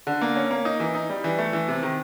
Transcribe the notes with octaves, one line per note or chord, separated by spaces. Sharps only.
D3
A#3
C#4
A#3
D#4
E3
D#4
G3
E3
A3
E3
C3
D#3